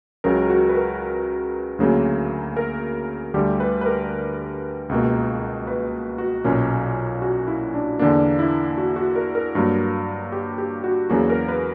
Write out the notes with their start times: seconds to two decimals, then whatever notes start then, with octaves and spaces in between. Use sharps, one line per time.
0.24 C#2 C#3 F#3 A#4
0.50 F#4
0.69 B4
0.76 A#4
1.79 D2 C#3 F#3 A#3
2.56 A#4
3.34 D2 D3 G3 G4
3.60 B4
3.81 B4
3.86 A#4
4.89 C#2 B2 A#3
5.67 B4
6.18 F#4
6.44 B1 A#2 A#3 C#4
7.22 F#4
7.47 E4
7.74 D4
7.99 E2 D3 A#3 D4
8.39 E4
8.78 F#4
8.96 F#4
9.16 A#4
9.35 A#4
9.55 G2 F#3 A#3
10.32 G4
10.58 G4
10.84 F#4
11.09 E2 C#3 F#3 A#3 F#4
11.30 A#4
11.48 B4